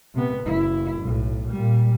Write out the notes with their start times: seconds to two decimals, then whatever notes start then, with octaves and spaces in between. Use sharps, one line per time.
0.14 C3 B3
0.44 F#1 E4
1.02 B1 A2
1.51 A#2 G3